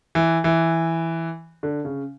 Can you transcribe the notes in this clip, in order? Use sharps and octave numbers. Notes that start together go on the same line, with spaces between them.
E3
E3
D3
C#3